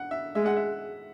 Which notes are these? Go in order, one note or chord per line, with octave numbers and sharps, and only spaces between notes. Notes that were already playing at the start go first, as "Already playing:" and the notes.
Already playing: F#5
E5
G#3 E5
F#5
E5